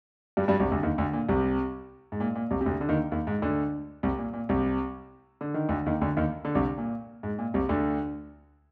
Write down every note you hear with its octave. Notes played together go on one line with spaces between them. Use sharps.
G2 G3
G2 G3
C2 C3
D2 D3
D#2 D#3
D2 D3
A#2
C2 C3
G#2
A#2
A#2
C2 C3
C3
D2 D3
D3
D#2 D#3
D#2 D#3
G#2
D2 D3
C2 C3
A#2
A#2
C2 C3
D3
D#3
D2 D3
D#2 D#3
D2 D3
D#2 D#3
D3
C2 C3
A#2
G#2
A#2
C2 C3
D2 D3